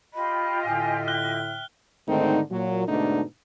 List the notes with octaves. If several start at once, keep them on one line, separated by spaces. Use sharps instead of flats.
F4 G4 D#5 B5
A2 D3 E5 G#5
G5 F6 F#6 G7
G#2 D3 D#3 A3 C4 D#4
A#2 F#3
G#2 B2 D3 A3 D4 D#4